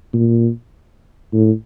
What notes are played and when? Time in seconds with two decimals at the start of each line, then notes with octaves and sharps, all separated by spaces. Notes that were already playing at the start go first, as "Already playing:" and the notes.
0.13 A#2
1.33 A2